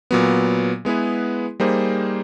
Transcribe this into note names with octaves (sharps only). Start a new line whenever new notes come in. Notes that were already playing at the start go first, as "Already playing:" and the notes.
A#2 F#3 B3
G#3 B3 E4 G#4 B4
G3 A#3 D#4 G#4 C5